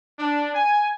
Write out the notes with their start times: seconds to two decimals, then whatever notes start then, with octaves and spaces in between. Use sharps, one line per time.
0.19 D4
0.55 G#5